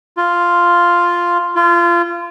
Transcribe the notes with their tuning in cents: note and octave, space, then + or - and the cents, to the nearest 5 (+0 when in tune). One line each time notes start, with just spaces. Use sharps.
F4 +0
F4 -25